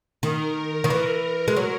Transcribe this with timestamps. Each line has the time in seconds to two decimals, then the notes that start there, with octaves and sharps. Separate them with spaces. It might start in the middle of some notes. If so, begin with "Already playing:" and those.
0.23 D#3 A#4
0.84 D#3
0.90 E3
1.48 G#3
1.57 F#3